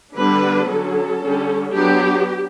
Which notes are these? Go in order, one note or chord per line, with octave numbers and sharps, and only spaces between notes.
D3 G3 B3 D4 B4
D3 F#3 C#4 A4
D3 G3 C#4
F#3 B3 D4 G4